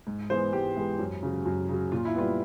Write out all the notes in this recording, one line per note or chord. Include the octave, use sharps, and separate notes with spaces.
G#2
E3 G#3 B3 C5
G#2 G4
E3 G#3 B3
F#2
C#3 F#3
F#2
C#3 F#3
A#2 F4
E4
G3 B3 F4